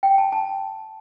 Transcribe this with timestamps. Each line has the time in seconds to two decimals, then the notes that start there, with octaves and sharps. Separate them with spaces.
0.03 G5
0.18 A5
0.32 A5